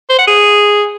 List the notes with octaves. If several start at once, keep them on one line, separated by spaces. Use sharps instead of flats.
C5
F#5
G#4